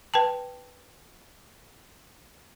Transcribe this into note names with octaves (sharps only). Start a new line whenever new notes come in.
B4 G5 A5